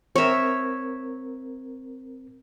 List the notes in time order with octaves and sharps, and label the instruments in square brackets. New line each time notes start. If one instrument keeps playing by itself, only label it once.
[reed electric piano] C4 A#4 [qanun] C#5 E5